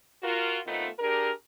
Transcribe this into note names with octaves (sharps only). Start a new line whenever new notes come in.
F4 F#4 A#4
D#3 A3 B3 C4 D#4 F4
D4 G4 G#4 A#4